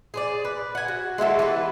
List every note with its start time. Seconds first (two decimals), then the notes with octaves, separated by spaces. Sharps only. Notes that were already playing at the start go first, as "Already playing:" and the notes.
0.14 G#4 C5 D5
0.45 B4
0.75 F#5 G#5
0.88 F#4
1.18 G#3 E4 F#4 A4
1.39 E3 G3 B4